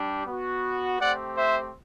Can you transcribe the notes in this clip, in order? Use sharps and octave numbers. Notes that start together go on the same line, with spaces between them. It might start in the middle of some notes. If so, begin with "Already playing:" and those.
Already playing: G3 D4 G4
B3 F#4
A3 C4 G4 D5 F#5
C5 E5